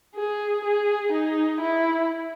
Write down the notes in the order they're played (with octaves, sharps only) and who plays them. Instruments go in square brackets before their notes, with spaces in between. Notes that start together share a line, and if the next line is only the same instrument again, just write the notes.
[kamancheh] G#4
G#4
D#4
E4